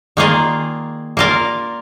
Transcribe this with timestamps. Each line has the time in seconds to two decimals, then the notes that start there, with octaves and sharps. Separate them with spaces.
0.17 D#3 A#3 F4 G#4 D5
1.17 A#3 F4 A#4 D5 F5